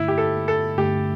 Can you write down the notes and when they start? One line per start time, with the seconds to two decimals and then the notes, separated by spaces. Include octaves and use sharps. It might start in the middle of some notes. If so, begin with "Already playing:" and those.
Already playing: G2 D3 A3 E4
0.08 G4
0.18 A4
0.48 A4
0.77 G2 D3 A3 G4